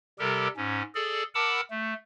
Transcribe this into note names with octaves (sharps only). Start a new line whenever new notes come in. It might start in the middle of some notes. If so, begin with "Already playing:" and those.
C3 G3 G4 A4 A#4
G#2 C#4
G#4 A4 D5
A#4 F#5 A5 B5 D6 E6
A3